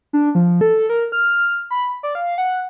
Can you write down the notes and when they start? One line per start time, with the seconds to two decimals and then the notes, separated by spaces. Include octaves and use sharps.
0.13 D4
0.35 F3
0.61 A4
0.89 A#4
1.12 F6
1.71 B5
2.03 D5
2.15 F5
2.38 F#5